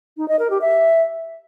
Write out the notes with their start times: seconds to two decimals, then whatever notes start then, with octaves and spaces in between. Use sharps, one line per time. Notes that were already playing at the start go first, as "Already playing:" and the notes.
0.17 D#4
0.28 D#5
0.39 A#4
0.50 G4
0.61 E5